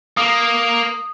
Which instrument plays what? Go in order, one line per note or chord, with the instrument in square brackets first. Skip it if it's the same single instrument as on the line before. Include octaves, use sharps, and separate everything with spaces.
[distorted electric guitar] A#3 [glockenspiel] D#6